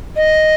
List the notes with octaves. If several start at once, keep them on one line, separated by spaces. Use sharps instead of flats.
D#5